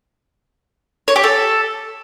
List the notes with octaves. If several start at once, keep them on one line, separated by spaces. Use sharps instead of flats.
C#5
G4
A4